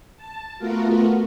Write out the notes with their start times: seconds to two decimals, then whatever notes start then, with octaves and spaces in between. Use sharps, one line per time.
0.17 A5
0.59 A3 B3 F4 F#4 A#4